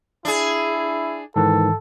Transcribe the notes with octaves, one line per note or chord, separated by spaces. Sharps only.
D4 E4 G#4
G#2 D#3 E3 A4